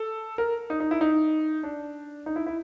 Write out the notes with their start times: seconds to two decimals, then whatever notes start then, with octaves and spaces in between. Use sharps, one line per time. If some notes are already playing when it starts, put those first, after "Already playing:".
Already playing: A4
0.38 A#4
0.70 D#4
0.80 D#4
0.91 E4
1.01 D#4
1.63 D4
2.26 D#4
2.36 E4
2.46 E4